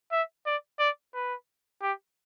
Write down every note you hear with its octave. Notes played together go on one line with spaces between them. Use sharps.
E5
D5
D5
B4
G4